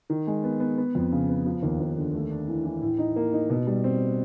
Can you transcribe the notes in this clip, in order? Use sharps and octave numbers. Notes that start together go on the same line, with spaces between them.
D#3
G#3
B3
B3
B3
F2
C#3
B3
F3
D#2
D#2
D3
A3
D4
E3
E3
A2
D#4
A#3
D#4
B2
G3
C4